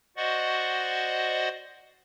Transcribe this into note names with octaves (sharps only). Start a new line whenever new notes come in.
F#4 C5 D5 D#5 F#5 C#6